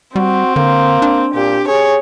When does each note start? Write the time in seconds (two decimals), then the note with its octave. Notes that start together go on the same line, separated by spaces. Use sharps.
0.16 G3 C4 F#4
0.56 D3 A#3
1.02 D4
1.34 A#2 G4
1.68 G#4 C#5